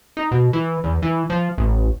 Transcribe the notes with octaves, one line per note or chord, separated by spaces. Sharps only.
D#4
B2
E3
E2
E3
F3
A1